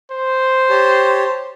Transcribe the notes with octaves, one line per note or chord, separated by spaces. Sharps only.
C5
G4 C#5 A5